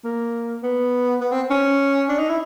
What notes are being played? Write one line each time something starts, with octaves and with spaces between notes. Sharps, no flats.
A#3
B3
B3
C4
C#4
D4
D#4
E4